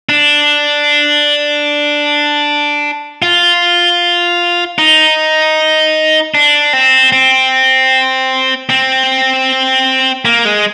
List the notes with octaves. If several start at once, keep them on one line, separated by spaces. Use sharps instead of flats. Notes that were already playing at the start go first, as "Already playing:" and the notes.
D4
F4
D#4
D4
C4
C4
C4
A#3
G#3